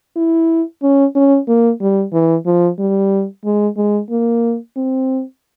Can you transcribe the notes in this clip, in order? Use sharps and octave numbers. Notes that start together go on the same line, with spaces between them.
E4
C#4
C#4
A#3
G3
E3
F3
G3
G#3
G#3
A#3
C4